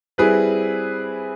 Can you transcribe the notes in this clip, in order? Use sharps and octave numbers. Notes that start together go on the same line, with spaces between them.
G3 C4 E4 G#4 B4